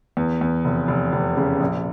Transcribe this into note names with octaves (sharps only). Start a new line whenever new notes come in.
E2
E2
F1
F1
F1
C#3
A#1